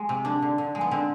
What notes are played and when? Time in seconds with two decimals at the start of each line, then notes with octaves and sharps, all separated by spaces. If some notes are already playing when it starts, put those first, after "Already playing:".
Already playing: G#3
0.09 C3
0.25 D3 D4
0.42 D3
0.58 D3
0.75 G#3
0.81 B3
0.91 D3 C4